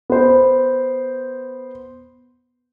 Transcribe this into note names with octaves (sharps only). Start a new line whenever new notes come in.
B3 C5